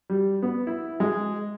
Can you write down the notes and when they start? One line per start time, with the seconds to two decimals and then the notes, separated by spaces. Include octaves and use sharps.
0.10 G3
0.43 B3
0.67 E4
1.00 G#3